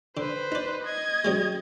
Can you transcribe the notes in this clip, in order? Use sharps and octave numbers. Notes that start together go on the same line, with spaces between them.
D3 B4 C5
D#4 D5
D#5 G#6
F#2 G3 G#3